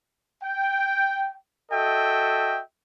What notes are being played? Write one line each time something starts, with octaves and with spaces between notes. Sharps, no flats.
G5
F#4 A4 D#5 E5 G5